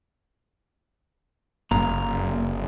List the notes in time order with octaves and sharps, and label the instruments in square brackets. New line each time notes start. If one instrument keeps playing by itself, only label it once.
[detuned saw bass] F#1 [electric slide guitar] A#3 A#5